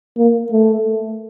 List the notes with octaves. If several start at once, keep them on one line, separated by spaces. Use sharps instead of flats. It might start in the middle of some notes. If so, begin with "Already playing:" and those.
A#3
A3